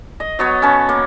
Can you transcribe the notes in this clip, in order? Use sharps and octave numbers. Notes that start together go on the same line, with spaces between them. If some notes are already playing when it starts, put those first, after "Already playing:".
D#5
F#3 B3 C#5
C#4 B4 A5
A#3